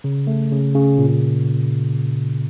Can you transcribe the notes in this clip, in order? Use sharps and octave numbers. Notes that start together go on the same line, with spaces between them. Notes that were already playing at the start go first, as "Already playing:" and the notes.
C#3
A3
C#3
C#3
A#2